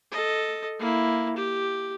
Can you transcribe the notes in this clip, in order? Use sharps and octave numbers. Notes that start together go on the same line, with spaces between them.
A4 D#5
A#3 E4
G4